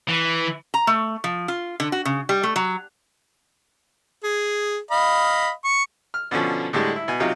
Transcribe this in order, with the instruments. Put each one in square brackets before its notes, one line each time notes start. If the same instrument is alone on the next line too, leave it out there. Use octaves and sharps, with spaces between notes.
[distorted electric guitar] E3
[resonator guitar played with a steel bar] A#5
A3
F3
F4
D3
F#4
C#3
G3
A3
F#3
[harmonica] G#4
D#5 F5 B5
C#6
[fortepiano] F6
B2 D3 F3 C#4
A2 D3 G3 G#3
E4
B2 G#5
C3 F#3 D#4 F4